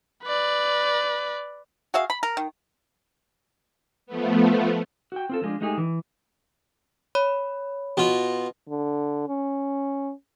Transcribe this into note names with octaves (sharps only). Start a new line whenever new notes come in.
B4 D5
F#4 G#4 E5 F5
B5
A#4
D#3
F3 A3 B3
F#4 G5
C4 F4 A4
F3 G#3 D4
G#3 A3 D#4 G4 G#4
E3
C#5 B5
B2 F4
D3
C#4